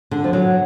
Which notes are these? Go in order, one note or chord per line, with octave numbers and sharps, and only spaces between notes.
D3
F3
F#3